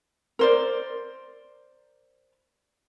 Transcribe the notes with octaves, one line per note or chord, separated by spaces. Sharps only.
A#4 C5 D5